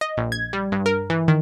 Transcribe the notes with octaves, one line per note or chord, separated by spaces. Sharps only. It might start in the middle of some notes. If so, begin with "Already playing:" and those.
D#5
A#1
G#6
G3
G2
A#4
E3
D#3